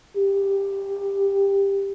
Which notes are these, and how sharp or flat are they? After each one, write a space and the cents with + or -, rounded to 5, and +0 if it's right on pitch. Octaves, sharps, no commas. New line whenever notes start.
G4 +10